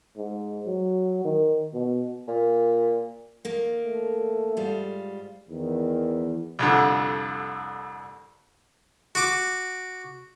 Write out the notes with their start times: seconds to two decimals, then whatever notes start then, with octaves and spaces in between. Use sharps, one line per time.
0.17 G#2
0.66 F#3
1.25 D#3
1.73 B2
2.28 A#2
3.45 D#3 A#3
3.83 A3
4.57 G#2 G3 F4
5.49 E2 D#3
6.59 C2 F2 D3
9.15 F#4 D6